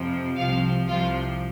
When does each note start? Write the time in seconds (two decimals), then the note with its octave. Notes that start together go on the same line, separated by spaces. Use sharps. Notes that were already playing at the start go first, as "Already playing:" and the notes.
Already playing: F2 C3 F3
0.37 C2 C3 F3 F5
0.88 C2 C3 F3 F4